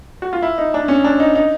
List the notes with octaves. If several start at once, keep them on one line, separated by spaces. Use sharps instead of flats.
F#4
F4
E4
D#4
D4
C#4
D4
D#4
D#4